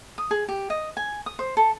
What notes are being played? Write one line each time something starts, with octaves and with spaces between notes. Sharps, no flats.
D#6
G#4
G4
D#5
G#5
D#6
C5
A4